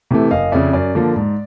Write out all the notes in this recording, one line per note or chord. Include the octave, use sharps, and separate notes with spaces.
C3 E3 A3
F#1 D#5 F5
F2 C#3 D5 E5
F#2 D5
D3 F3 A#3
G#2